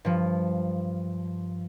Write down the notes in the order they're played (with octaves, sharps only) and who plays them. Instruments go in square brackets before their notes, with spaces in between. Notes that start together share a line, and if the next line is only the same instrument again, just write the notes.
[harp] G2 F3